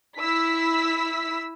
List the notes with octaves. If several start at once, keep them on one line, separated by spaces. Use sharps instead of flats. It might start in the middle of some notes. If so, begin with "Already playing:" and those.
E4 E6 B6